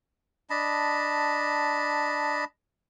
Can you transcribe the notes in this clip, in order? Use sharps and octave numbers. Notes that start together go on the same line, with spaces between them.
D4 D#5 A5 B5